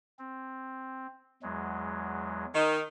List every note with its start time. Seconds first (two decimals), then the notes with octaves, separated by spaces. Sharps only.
0.19 C4
1.43 E2 F#3 G#3
2.55 D#3